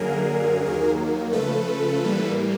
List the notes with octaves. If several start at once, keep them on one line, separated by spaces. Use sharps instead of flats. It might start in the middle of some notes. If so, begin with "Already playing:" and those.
Already playing: F#2 D3 F#3 A#3 G#4 A#4
D#2 D#3 F#3 A#3
C#3 F3 A3 A4 B4
A2 E3 G3 A#3